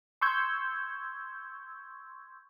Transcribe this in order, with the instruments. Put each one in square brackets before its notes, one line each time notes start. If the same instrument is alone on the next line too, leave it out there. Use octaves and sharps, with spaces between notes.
[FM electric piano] C6 C#6 E6 G6 G#6